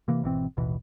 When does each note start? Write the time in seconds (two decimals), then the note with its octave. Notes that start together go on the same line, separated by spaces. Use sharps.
0.08 C3 E3 A#3
0.22 G#1 B2 E3 C4
0.57 A1 D#2 B2 E3